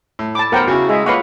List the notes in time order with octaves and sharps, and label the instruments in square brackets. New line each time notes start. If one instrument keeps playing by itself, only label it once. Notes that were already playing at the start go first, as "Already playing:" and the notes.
[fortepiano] A2
[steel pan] A5 D6 [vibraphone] B5
[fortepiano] B1 C5 [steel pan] A#4 F#5 G5
[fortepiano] C#3 E4 [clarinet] F#4
[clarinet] G#3 [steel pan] G#4 E5
[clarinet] A#3 [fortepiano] F4 C#5 [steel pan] B4 F5 F#5